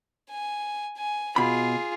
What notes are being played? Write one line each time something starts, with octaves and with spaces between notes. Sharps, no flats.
G#5
G#5
B2 F4 G#4 B5